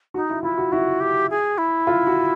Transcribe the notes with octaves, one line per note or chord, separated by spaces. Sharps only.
D#4 F#4
E4
E4 F4
F#4
E4 F#4
G4
G#4
E4
F4
F#4